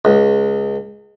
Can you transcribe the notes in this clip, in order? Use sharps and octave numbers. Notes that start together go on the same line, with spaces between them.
C#2